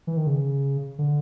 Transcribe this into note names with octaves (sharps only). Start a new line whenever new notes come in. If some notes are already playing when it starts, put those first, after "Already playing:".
E3
D#3
C#3
D3